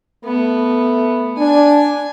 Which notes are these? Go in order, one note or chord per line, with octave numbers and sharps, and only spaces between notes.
A3 B3
D4 G#5